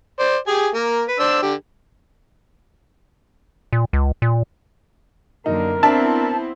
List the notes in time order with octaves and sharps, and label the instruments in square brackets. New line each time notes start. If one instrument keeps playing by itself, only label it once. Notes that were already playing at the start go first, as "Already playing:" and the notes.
[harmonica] C5 D5
G4 G#4 G#5
A#3 A#4
B4
D4 C5 E6
D3 G4
[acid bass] A#2
C#2
A#2
[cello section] F#2 D3 A#3 [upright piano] D#4 [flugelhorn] A#4
[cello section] B3 C4 E4 [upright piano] D4 E5 [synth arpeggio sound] A5